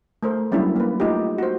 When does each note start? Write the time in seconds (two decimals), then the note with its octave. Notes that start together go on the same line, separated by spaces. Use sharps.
0.23 A3 A#4 C5
0.52 F#3 G3 A#3 C#4 D4 E4
0.76 A#3 B4
1.00 A3 D#4 F4 G4
1.38 F#4 C5